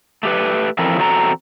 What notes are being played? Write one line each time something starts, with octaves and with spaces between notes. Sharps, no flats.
A3 G4 B4
E3 F3 C4 E4 A4 A#4
E2 C4 F#4 A4 A5 A#5